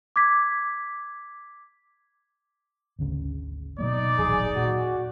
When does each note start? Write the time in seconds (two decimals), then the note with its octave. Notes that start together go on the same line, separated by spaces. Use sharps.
0.16 D6 G#6 B6
2.99 G#1 D2 C#3
3.78 B2 F#3 A#3 D#4 D5
4.19 D#1 A1 F#3 G#4
4.56 A#2 F#4